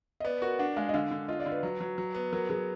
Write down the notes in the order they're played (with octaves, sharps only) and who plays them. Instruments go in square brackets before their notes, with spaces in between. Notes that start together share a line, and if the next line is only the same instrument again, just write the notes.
[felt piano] D#5
[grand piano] B3 [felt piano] D5
[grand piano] F#4 [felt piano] A#4
[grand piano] D4 [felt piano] F#5
[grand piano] G#3 [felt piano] F5
[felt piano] D#5
[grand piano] D3 [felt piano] F5
[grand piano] D3
[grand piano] F4 [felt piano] D#5
[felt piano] D5
[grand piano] D3
[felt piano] B4
[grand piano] F#3
F#3
F#3
B3
[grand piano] F#3 [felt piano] A#4
[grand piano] F#3 [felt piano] G#4